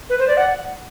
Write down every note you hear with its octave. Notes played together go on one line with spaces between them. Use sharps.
B4
C5
D5
F#5